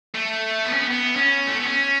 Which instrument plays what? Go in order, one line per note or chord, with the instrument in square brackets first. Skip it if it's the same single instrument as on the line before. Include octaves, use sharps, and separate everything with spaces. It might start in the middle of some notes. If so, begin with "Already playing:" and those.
[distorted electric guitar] A3
B3
C#4
B3
B3
C#4
A3
B3
C#4